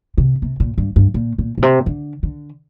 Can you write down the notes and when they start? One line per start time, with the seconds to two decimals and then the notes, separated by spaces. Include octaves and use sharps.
0.18 C3
0.42 C3
0.60 A#2
0.78 G2
0.96 G2
1.14 A#2
1.38 A#2
1.58 A#2
1.62 C3
1.86 D3
2.23 D3